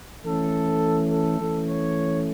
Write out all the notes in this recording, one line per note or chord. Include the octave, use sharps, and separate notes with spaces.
E3 A3 C#4 A4
A4
E3 A3 C#4
C#5